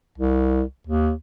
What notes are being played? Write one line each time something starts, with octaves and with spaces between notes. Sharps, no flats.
C2
D#2